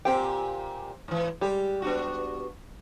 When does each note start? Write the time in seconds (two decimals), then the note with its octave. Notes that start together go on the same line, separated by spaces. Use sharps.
0.05 A#2 C4 G4 G5
1.08 G#2 E3
1.41 G3 G#3 G4
1.82 B3 D4 F#4